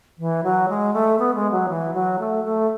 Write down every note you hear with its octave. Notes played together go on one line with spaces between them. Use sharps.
E3
F#3
G#3
A3
B3
G#3
F#3
E3
F#3
A3
A3